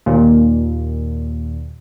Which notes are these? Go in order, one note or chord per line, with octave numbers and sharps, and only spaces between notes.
D#2 A#2